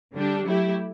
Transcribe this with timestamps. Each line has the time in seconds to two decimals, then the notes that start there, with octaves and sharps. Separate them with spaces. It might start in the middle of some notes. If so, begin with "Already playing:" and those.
0.14 D3 G3 D4 G4
0.45 F#3 A3 E4 G4